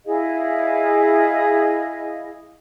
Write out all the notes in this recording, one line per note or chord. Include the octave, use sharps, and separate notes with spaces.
E4 G#4 D#5 F5